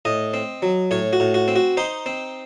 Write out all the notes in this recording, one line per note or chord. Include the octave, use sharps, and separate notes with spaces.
A2 D#5
C4
F#3
A2 C#5
F#4
A2
F#4
C4
F#4
D#4 C5
C4